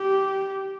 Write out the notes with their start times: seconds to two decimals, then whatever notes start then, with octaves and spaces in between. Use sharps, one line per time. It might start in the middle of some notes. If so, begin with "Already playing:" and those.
Already playing: G4